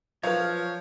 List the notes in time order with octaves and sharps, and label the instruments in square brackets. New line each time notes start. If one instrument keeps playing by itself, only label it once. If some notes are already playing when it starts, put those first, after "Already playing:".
[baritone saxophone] F3 [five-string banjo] F#3 B4 [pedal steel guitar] C#5 [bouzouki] F5